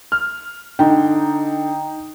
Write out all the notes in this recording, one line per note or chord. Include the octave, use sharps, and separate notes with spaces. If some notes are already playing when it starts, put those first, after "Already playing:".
F6
D3 D#4 G5